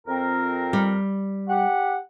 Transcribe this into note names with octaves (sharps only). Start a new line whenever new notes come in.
F2 C4 A#4
G3
G4 F#5